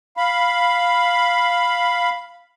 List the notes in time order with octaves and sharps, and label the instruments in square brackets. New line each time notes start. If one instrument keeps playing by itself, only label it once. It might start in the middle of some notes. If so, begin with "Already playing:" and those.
[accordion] F5 B5